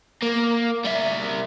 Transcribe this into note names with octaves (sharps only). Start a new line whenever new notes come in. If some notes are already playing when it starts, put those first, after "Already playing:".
A#3
G3 E5